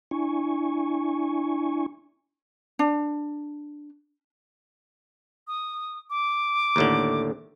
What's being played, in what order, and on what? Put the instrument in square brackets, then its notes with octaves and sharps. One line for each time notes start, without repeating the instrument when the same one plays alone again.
[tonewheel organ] D4 E4 G#5 C#6
[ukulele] D4
[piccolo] D#6
D6
[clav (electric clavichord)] D#2 A2 D3